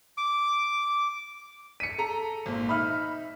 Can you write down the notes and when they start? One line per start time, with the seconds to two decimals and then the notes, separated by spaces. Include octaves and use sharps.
0.17 D6
1.80 B6 C#7 D#7
1.98 A4 A#5
2.46 G#1 A#2
2.69 D#4 E5 B5 F6